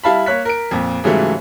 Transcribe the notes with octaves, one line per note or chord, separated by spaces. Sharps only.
G3 E4 F5 A5 B5
A#3 C#5 F#6 B6
A#4 D7
F2 A#2
G#2 C#3 E3 F#3 G3 A3